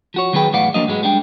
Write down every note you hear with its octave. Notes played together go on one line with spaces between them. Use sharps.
F3 F#4 C#5
D#3 F#3 B3 G#4 B4 G5
E2 A2 B3 D5 F5 F#5
F3 F#3 A#3 D4 D#5
G#2 F#3 G#3 B3
G3 G#3 D4 F#5 G5